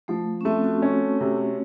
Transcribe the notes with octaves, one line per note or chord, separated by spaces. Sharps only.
F3 A3
C#4
A3 C4
F#4
C#4
C3